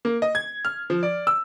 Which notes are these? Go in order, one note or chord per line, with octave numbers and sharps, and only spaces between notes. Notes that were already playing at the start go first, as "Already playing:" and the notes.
A#3
D#5
G#6
F6
F3
D5
E6